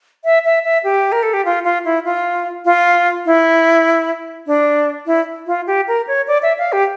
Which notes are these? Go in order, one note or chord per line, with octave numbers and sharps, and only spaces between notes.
E5
E5
E5
G4
A#4
A4
G4
F4
F4
E4
F4
F4
E4
D4
E4
F4
G4
A#4
C#5
D5
E5
F5
G4